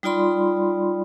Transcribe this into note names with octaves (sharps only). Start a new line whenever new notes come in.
G3 D#4 F4 D5 B5 C6